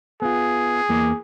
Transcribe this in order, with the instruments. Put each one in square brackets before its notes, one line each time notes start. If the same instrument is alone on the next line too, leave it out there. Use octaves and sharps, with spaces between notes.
[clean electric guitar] B3 F4 [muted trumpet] G#4
[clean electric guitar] E2 E3 A#3